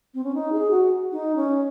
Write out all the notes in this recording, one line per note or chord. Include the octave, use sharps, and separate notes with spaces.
C4
C#4
D#4
G#4
F#4
D#4
C#4